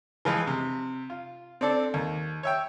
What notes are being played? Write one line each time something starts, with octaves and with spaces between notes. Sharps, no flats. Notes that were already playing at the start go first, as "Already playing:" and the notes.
E3 F3 G#3 B4
C3
F4
C4 D4 A4 D5
D#2
C#5 E5 G5